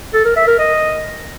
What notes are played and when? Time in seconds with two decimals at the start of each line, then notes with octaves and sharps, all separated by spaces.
0.14 A4
0.25 A#4
0.36 E5
0.48 A#4
0.59 D#5